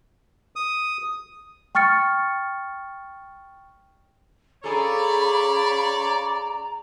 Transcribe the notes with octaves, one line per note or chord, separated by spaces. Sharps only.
D#6
G5 C#6 F6 A6 C#7
C#4 G#4 A4 C#5 D5 F5 A#5 B5